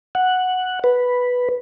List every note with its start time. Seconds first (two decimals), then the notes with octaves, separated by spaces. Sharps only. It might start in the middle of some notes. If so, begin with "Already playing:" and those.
0.15 F#5
0.84 B4